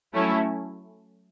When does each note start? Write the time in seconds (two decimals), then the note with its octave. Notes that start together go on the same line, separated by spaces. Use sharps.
0.14 F#3 A3 C#4 E4